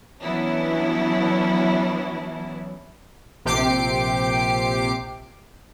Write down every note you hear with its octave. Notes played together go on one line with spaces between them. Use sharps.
E3 F#3 B3 C#4 D4 E4
A#1 C3 G4 D6 C7 D7